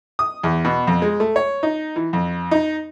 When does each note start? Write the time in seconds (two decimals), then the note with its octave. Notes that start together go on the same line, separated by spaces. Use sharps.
0.19 D#6
0.44 E2
0.65 B2
0.87 F2
1.02 G#3
1.20 A3
1.36 C#5
1.63 D#4
1.96 E3
2.13 F2
2.51 D#4